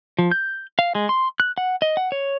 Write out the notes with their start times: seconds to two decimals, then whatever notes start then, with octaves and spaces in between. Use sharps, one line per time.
0.19 F3
0.31 G6
0.79 F5
0.95 G#3
1.09 C6
1.40 F#6
1.58 F#5
1.82 D#5
1.97 F#5
2.12 C#5